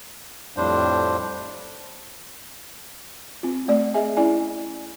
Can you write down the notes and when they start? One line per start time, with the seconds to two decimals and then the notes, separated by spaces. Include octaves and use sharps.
0.57 F2 A2 G3 D4 C5
3.43 C4 F4
3.68 A3 C4 D5
3.94 G#4 D#5 E5 G#5
4.17 C#4 E4 D5 G#5